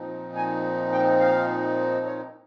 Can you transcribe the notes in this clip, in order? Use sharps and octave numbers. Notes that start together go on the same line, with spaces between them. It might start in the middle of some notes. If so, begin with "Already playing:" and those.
Already playing: A#2 F3 C4 D#4
G#5
G5
F5
C#5